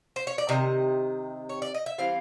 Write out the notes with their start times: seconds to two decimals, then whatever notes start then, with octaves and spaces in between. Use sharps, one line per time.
0.16 C5
0.27 C#5
0.38 D5
0.49 C3 D#3 D#5
1.49 C#5
1.62 D5
1.74 D#5
1.86 E5
1.98 E3 G3 C4 F5